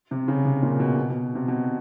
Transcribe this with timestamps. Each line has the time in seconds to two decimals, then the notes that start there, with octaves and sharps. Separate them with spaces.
0.11 C3
0.28 C#3
0.45 C3
0.63 A#2
0.80 B2
0.97 B2
1.10 B2
1.35 C3
1.48 B2